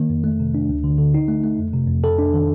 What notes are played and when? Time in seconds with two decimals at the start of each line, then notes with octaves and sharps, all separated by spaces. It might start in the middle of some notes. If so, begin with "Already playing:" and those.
Already playing: D#3 A#3
0.10 F2
0.24 A3
0.40 C3
0.54 D4
0.69 D2
0.84 D3
0.98 D3
1.14 D#4
1.28 A3
1.44 A3
1.58 F2
1.73 C3
1.88 F2
2.04 A4
2.18 D4
2.34 D#3